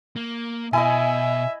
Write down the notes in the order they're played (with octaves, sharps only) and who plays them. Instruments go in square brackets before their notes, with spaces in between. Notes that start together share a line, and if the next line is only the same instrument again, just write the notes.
[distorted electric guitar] A#3
[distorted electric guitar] B2 [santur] E4 D#5 [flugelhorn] E5 [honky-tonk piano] G#5